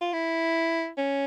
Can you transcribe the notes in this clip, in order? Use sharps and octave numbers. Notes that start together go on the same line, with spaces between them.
F4
E4
C#4